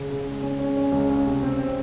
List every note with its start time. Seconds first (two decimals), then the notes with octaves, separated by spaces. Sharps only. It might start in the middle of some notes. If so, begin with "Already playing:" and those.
Already playing: C#3
0.10 C#3
0.26 G#3
0.42 C#4
0.60 C#4
0.77 C#4
0.92 C#2
1.10 C#4
1.26 C3
1.43 C4
1.59 C4